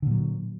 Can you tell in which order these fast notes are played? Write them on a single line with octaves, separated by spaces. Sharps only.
D3 A#2 F#3